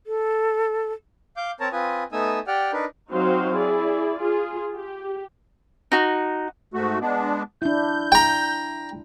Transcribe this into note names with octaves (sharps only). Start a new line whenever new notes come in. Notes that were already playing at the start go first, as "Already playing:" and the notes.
A4
F5 D6 G6
C4 A#4 C#5 A5 A#5
C4 F4 B4 G#5 D#6
A3 B3 D#4 G#5 D#6 E6
G4 D5 F#5 G5 F6
D4 D#4 A#4 B4
F#3 C4 D#4 F#4 C5 F5
E4 G#4 D5
F4 G#4
G4
D#4 F#4
G#2 A3 F#4
G#3 B3 D4
D4 E4 G6
G5 A#5